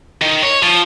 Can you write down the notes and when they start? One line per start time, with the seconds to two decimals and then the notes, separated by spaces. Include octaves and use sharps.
0.22 D#3
0.43 C#5
0.63 F3